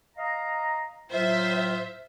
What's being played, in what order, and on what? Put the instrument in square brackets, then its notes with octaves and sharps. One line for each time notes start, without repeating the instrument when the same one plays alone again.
[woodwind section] D#5 F5 A#5
[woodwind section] A2 F#3 F4 [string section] C5 E5